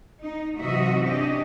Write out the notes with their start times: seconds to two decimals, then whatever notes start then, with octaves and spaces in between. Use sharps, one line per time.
0.22 D#4
0.58 C3 E3 F#3 F#4 D#5 E5
1.05 C#4 D4 G4 D#5